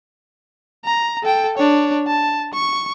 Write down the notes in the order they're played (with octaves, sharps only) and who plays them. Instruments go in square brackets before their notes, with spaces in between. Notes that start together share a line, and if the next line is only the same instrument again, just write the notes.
[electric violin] A#5
A4 G5
D4 C#5
A5
C#6